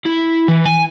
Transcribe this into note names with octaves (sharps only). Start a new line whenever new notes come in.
E4
E3
G#5